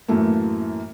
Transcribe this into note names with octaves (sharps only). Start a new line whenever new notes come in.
F#2 A2 E3 A3 A#3